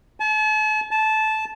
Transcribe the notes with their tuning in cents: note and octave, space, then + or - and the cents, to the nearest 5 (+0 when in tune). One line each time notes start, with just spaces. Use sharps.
A5 -40
A5 -15